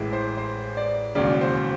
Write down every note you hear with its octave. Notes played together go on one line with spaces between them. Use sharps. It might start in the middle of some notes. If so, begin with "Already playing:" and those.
Already playing: A1 A2 E3 G#3
C5
C5
D5
E1 D#2 C#3 D5
C5